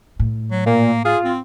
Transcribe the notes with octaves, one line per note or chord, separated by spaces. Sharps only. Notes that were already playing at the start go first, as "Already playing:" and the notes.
A2
F#3
A#2 A#3
F4 G#4
C4